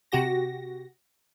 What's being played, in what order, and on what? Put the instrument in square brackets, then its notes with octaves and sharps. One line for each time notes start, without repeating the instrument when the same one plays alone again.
[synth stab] C3 F#4 G4 A#6